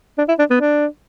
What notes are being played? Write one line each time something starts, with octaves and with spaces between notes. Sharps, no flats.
D4
E4
D4
B3
D4